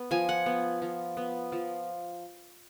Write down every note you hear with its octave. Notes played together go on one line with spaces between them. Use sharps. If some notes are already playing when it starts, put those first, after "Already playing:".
Already playing: B3
F3 G#5
F#5
B3
F3
B3
F3